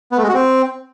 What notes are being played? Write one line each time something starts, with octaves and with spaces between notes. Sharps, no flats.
B3
A3
G#3
F#4
C4